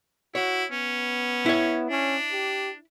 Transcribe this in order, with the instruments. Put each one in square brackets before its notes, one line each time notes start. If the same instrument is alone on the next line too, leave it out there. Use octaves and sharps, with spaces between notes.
[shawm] E4 [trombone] F#4 [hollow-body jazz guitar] C#5
[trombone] B3 [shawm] C#4
[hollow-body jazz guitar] E4 C#5
[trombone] C#4 [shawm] D4
[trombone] G4